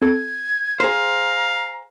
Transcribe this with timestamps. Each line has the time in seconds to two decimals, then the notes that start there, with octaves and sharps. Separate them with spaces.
0.02 C4 A4 G#6
0.80 G#4 C5 F5 A#5